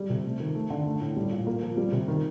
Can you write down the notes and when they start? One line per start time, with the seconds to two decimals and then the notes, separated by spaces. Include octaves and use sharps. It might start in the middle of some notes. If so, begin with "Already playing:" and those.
Already playing: G3
0.10 C3
0.25 A3
0.40 D#3
0.55 A3
0.70 D3
0.86 A3
1.01 A2
1.17 G3
1.31 A#2
1.47 A#3
1.62 F3
1.77 G3
1.92 C3
2.08 D#3